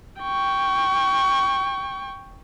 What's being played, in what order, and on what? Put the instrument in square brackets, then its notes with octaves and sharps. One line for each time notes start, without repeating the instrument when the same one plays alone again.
[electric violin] G5 C#6